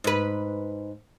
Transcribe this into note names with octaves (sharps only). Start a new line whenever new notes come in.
G#2 B4